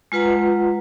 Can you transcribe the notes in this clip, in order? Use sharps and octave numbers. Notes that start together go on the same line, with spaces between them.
G#3 F4 B4 F#5 A#5